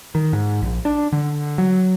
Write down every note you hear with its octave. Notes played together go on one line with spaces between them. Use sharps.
D#3
G#2
A#1
D4
D3
F#3